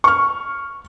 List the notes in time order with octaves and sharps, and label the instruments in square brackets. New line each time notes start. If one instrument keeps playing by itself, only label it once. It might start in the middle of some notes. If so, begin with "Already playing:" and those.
[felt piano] C#6 F6